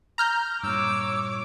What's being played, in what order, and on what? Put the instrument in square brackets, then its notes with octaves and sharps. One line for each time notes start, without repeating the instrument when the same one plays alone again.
[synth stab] A#5 F6 G6
[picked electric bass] G2 A#2 [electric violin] C#5 D6 [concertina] E6